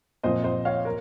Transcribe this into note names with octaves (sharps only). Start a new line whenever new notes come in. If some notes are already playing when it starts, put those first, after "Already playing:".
A#2 F3 C4 C5 D#5
C5 D#5
C#5 F5
A#4